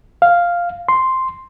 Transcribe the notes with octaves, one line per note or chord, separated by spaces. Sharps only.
F5
C6